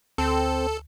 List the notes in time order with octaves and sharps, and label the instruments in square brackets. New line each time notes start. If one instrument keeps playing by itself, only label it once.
[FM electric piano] D2 [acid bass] C4 [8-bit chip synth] A4